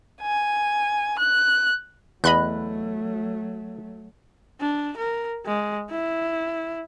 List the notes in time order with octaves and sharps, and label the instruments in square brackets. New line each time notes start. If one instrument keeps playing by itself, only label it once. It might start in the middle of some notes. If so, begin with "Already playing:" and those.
[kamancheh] G#5
F#6
[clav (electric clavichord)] E2 [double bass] F#3 A3 [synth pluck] D#5 B5 F#6
[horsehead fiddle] D4
A#4
G#3
E4